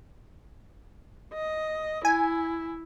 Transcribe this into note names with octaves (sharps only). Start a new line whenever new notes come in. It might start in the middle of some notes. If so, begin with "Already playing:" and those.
D#5
E4 G#5